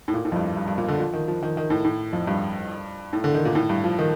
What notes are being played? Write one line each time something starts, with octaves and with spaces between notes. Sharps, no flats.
A2
A#2
A2
F2
G2
G2
G2
A#2
D3
F3
D#3
F3
D#3
D#3
A2
A2
F2
G2
A2
D3
D#3
A#2
A2
G2
F3
D#3